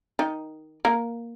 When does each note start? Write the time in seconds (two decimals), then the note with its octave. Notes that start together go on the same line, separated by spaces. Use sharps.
0.19 D#3 D#4
0.85 A#3 A#4